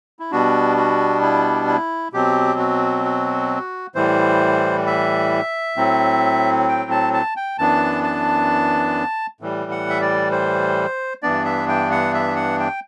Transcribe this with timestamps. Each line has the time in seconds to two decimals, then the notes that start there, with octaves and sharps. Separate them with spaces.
0.19 E4
0.31 B2 G3 B3 D4 F#4
0.77 F#4
1.22 E4
1.67 E4
2.13 B2 F#3 C4 G4
2.59 F#4
3.05 F#4
3.95 A2 E3 G3 C5
4.87 E5
5.77 A2 F#3 C4
6.69 G5
6.91 A5
7.13 A5
7.36 G5
7.59 F#2 E3 B3 D4 A5
8.04 A5
9.41 A2 E3 G3
9.71 F#5
9.89 E5
10.01 D5
10.32 C5
11.23 G2 E3 B3 D4 D5
11.45 E5
11.69 G5
11.91 F#5
12.14 E5
12.36 F#5
12.60 G5